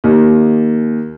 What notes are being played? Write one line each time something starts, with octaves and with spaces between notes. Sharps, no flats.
D#2